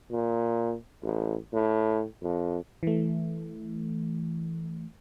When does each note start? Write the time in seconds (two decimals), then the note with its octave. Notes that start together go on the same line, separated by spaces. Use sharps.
0.11 A#2
1.02 A1
1.53 A2
2.22 F2
2.83 E3 A3